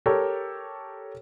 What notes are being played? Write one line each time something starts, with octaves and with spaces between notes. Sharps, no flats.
G4 A4 A#4 C#5